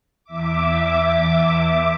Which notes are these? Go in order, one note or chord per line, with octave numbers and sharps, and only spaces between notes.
E2 E5 D6